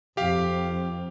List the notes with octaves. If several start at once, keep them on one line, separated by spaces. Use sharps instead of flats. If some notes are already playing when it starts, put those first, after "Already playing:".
F2 G4 F5